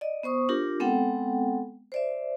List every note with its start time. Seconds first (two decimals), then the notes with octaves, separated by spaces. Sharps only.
0.01 D5 D#5
0.23 B3 C5 C#6 D#6
0.49 D4 F4 G4 A#4
0.80 G#3 B3 C4 A4 F#5 G5
1.92 C5 D5 E5